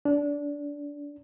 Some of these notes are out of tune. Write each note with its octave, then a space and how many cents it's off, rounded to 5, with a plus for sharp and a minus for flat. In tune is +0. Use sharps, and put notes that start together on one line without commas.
D4 -20